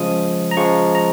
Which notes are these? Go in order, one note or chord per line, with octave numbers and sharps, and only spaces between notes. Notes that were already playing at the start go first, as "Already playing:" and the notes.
Already playing: C#3 F3 G#3 D#6
A#5
C#3 F3 G#3 C#6
A#5